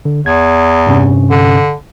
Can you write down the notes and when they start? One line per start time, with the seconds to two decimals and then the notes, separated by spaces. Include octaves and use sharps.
0.05 D3
0.26 E2 G#6
0.87 G2 C3 C#4
1.30 D3